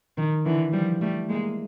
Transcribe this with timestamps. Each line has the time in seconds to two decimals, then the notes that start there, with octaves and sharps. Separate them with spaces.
0.18 D#3
0.45 D3 E3
0.73 F3 G3
1.01 G3 A3
1.29 G#3 A#3